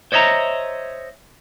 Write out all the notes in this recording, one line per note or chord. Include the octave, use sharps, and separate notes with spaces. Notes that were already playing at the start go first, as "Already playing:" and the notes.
C5 C#5 D#5 E5 A#5